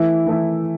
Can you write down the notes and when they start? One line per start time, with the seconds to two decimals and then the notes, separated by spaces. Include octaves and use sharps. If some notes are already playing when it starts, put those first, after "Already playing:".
Already playing: E3 A3 E4
0.26 E3 A3 E4